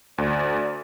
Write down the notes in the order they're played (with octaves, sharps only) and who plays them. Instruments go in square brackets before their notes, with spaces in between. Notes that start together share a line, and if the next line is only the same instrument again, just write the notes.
[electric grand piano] D2 [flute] D5